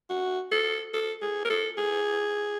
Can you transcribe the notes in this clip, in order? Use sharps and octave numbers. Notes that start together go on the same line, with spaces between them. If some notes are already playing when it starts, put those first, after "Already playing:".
F#4
A4
A4
G#4
A#4
A4
G#4